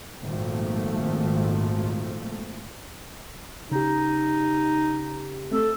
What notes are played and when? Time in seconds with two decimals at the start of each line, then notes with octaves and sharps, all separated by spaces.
0.22 G#1 A#2 F3 A3
3.71 C#3 D#4 G4
5.51 A3 C4 A4